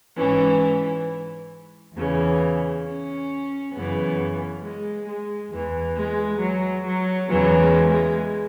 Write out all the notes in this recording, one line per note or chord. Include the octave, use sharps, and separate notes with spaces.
G#2 E3 C#4
E2 C#3 E3
C#4
F#2 C#3 E3 B3
G#3
G#3
E2 E3
G#3
F#3
F#3
E2 C#3 E3 F#3
G#3
G#3